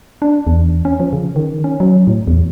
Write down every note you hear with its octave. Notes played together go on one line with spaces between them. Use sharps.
D4
E2
C#4
F3
C#3
D#3
C#4
F#3
A2
E2